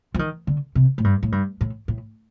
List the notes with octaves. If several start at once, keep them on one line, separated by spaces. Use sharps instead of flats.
F3
D#3
D3
C3
A2
G2
A2
G2
A2
A2